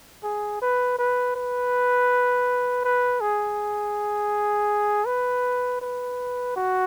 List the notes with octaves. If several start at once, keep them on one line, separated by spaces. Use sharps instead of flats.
G#4
B4
B4
B4
B4
G#4
B4
B4
F#4